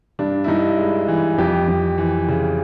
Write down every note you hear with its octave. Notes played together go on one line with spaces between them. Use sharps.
G2 D4
E4
G2 D#4
G#3
E3
F2 G4
F2
E3
C#3